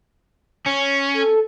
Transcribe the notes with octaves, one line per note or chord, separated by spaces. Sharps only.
C#4
A4